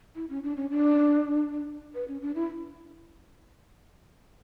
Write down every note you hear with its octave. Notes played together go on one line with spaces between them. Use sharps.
E4
C#4
D4
C#4
D4
B4
C#4
D4
E4